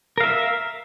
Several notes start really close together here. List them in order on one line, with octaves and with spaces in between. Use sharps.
A#4 F5 E5